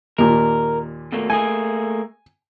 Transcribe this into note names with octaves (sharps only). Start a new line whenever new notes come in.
D#2 A#2 A#4
B2 A3 A#3
A3 A#3 G#4 G#5